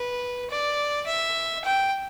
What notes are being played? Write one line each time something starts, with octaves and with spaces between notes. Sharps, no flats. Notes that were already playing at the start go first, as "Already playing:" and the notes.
Already playing: B4
D5
E5
G5